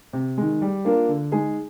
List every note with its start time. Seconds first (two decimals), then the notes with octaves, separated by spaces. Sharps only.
0.13 C3
0.37 D#3 G#3
0.62 G3
0.85 A#3 D4 F4 A#4
1.09 D3
1.32 G#3 D#4 G#4